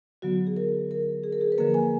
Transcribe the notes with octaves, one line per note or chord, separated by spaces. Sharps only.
D3 F#3 B3 F#4
G#4
A#4
A#4
G#4
A#4
G#4
B4
D3 F3 A#3 A#4
G#5